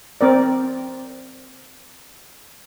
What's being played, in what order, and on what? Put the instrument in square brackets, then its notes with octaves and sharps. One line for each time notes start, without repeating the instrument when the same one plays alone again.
[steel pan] C4 A#4 D5